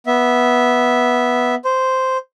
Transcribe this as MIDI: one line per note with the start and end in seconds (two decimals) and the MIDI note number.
0.07 1.55 59
0.07 1.55 76
1.65 2.17 72